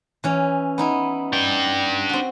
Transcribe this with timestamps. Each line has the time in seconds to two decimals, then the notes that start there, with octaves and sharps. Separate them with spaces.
0.24 E3 C#4
0.78 B3 D#4 E4
1.33 D4 G5
2.09 C4 F#4